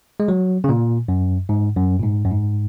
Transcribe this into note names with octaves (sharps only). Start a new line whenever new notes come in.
G#3
F#3
C#3
A#2
F#2
G#2
F#2
A#2
G#2
F#2
G#2